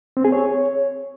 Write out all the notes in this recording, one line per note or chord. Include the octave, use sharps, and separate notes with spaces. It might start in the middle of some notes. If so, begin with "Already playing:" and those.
C4
G#4
C#5